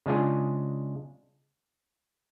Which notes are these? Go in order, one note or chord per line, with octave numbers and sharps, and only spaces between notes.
C#3 G#3 D4 F4 G#4